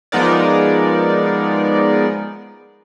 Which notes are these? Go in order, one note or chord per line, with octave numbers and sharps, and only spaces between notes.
F3 G#3 B3 D#4 A#4 D5